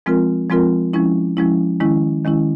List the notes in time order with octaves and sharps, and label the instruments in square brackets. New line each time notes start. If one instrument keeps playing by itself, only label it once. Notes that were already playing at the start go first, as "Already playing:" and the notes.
[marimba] F3 G#3 C4 F4 A#4
F3 G#3 C4 F4 A#4
F3 G#3 C#4 E4
F3 G#3 C#4 E4
D#3 G#3 C#4 E4
D#3 G#3 C#4 E4